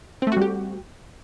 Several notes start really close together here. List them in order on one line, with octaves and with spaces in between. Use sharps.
C4 A3 F#4 G3 G4